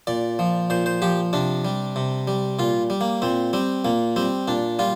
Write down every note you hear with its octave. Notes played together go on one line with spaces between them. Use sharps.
A#2 D5
F3
A#2 C5
C5
F3 G4
C3 D4
G3
C3
G3
A#2 F4
G3
A#3
A#2 C4
G3 C4
A#2 A#3
G3 C4
A#2 D4
G3 F4